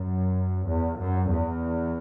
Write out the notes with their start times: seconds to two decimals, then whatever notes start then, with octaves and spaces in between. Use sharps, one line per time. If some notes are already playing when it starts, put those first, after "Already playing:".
Already playing: F#2
0.68 E2
1.00 F#2
1.31 E2